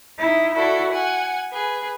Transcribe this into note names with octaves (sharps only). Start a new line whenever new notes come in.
D#4 E4
E4 F#4 A4 D5
F#5 G#5
G#4 B4